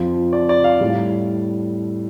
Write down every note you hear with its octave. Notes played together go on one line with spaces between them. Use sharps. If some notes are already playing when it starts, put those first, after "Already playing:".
Already playing: F2 F3
D5
D5
F5
A2 G3